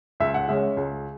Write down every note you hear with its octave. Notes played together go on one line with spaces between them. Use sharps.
C#2 E5
F#5
C#3 G#3 C#4 E5
C#2